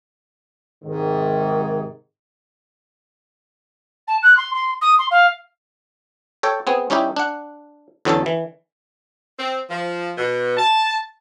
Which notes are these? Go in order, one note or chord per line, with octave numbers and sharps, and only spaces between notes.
G#2 C3 D#3
A5
F#6
C6
C6
D#6
C6
F5
A4 C#5 G5
B3 C4 G#4
G3 C#4 D#4 E4 G4
D4 F#5
E2 D3 F#3 C#4 A4 A5
E3
C4
F3
B2
A5